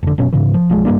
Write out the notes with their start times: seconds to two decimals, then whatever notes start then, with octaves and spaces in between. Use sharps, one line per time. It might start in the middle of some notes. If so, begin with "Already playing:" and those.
0.03 F1 D3
0.18 F#1 F#2 B2 C#4
0.33 G#2 C#3 E3
0.54 F3
0.70 B1 F3 G#3
0.85 G2 G3 A#3 D4